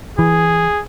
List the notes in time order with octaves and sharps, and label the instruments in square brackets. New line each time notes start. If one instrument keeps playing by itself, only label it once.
[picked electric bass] E3 [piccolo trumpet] G#4